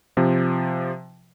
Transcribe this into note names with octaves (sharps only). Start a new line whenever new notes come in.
C3 F3